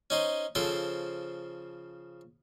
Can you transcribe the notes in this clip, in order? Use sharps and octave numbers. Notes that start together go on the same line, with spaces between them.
C#4 D#4 C5
C#3 F3 A4 C5